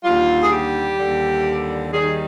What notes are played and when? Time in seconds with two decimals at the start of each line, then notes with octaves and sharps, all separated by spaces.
0.04 D#2 D3 G3 F4
0.40 G#4
0.51 G4
0.98 D#2 D3 G3
1.91 D#2 D#3 G3 G#4